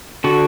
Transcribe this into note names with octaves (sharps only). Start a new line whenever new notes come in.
D3 F#4